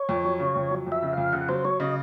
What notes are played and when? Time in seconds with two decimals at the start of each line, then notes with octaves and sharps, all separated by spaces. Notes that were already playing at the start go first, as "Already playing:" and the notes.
Already playing: C#5
0.09 F2
0.25 F#3
0.39 C#3
0.56 F2
0.71 F#3
0.87 F2
0.92 E5
1.02 C#3
1.13 F2 F5
1.33 C#3 F#5
1.49 F#3 C5
1.65 F#3 C#5
1.80 C#3 D#5